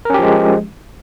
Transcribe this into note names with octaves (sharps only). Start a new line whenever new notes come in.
F3 G#3 C#4 G4 A#4